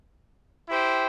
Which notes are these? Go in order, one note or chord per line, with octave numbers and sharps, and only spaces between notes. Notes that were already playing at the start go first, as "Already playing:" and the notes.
E4 G4 C5 G5